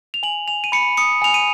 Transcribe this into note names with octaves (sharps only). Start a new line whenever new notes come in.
F7
G#5 F#7
G#5 F7
D#7
B5 C#7
D#6 C#7
G#5 F7
D#7